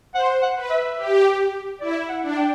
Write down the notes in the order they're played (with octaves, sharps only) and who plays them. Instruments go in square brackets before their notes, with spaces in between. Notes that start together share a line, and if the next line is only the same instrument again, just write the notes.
[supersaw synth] C5 [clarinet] F#5
[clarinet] F#5
[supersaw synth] B4
[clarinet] E5
[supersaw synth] G4
[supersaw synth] E4 [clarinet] D5
[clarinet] F#5
[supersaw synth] D4
[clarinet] G5